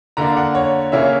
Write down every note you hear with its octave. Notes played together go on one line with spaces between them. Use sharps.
D3 A#3 D4 A#5
F#5
C#5
C#3 E3 A#3 C#4 E5